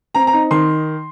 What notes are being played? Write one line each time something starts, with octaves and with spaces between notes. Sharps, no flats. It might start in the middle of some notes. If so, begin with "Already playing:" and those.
C4 A#5
A#5
D#4
D#3 C6